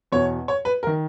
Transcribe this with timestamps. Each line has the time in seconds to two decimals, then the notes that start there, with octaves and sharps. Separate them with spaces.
0.12 E2 B2 C#5
0.48 C#5
0.65 B4
0.83 A#4
0.87 D#3